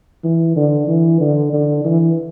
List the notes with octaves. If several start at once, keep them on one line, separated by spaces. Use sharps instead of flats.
E3
D3
E3
D3
D3
E3